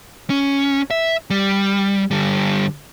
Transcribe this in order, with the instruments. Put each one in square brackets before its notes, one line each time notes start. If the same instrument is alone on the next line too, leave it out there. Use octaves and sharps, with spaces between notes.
[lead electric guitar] C#4
E5
G3
D3 G3